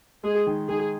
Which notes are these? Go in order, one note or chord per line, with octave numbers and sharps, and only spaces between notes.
G#3 G#4
D#3
D#3 G#4